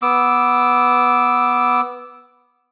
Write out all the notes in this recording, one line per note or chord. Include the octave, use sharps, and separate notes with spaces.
B3 D6 E6